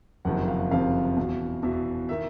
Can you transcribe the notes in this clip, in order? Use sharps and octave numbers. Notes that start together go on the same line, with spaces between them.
F#1 F2 C3 D#3 F#5
F5
F#1 F2 C3 D#3 F5
E2 B2
E2 B2 E5
D#3 E5